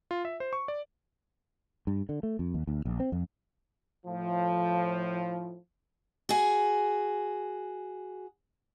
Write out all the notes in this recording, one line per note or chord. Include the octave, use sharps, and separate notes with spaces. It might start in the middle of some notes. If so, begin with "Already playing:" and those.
F4
E5
C5
C#6
D5
G2
D3
A3
F2
D#2
D2
A#1
C4
F2
A2 F3
F#4 G#4